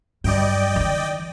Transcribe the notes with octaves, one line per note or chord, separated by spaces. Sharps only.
G2 F#3 D5 D#5 G5
D#3 E3